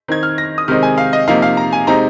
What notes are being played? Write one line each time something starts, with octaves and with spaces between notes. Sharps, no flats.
D#3 C4 D#4 G#6
F6
A#6
D#6
C3 D#3 G#3 C4 D#4 F6
G#5
F5
D#5
C3 F3 A#3 D#4 F5
F5
A#5
G#5
C3 G#3 C4 D#4 A#5